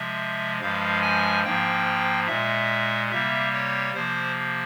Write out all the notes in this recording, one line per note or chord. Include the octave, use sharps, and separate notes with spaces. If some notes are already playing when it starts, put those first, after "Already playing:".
Already playing: C3 F3 G#3 E5
G2 F3 G#3 F5
G#5
G#2 F3 A#3 G5
A#2 G#3 E5
C3 G3 A#3 E5
C#5
C3 F3 A#3 C5